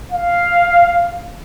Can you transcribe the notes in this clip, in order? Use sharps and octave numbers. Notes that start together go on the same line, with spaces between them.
F5